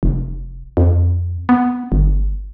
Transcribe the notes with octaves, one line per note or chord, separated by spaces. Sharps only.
F1
F2
B3
G1